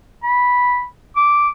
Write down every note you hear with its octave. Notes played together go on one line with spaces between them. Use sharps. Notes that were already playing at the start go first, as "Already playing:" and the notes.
B5
D6